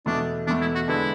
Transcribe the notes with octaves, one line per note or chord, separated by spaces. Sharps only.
E2 B2 A3 D4
E2 B2 A3 D4
E4
F#4
D3 G#3 B3 D4 E4